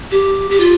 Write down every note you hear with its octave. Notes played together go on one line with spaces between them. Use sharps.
G4
G4
F4